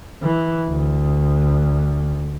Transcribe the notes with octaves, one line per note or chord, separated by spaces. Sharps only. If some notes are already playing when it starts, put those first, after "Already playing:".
E3
D2